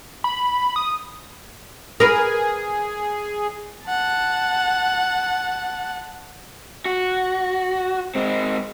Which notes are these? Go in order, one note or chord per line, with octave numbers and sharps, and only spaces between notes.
B5
D#6
G#4 A#4 B4
F#5 A5
F#4
G#3 C4